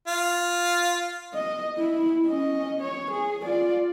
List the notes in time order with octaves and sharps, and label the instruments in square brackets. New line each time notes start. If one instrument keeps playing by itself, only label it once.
[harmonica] F4
[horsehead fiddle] D#5
E4
C#4 D#5
C#5
G#4
F4 D5